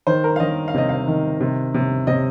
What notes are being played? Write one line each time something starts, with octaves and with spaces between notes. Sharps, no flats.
D#3 C5
A#4
F5
D#3 D#5
F5
C3 D#5
F5
D#3
C3
C3
C3 D#5